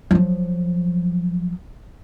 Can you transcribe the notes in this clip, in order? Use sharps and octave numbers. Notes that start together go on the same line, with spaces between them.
F3 F#3